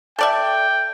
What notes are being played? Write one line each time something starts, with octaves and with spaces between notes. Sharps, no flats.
A4 D5 E5 G5